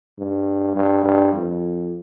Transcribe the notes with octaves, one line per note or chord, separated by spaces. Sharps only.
G2
G2
G2
F2